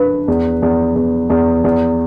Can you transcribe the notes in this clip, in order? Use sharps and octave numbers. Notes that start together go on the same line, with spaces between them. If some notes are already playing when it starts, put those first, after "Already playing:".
Already playing: D4 B4
E2
E2
E2
E2
E2